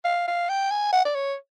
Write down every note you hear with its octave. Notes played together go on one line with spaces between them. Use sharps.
F5
F5
G5
G#5
F#5
D5
C#5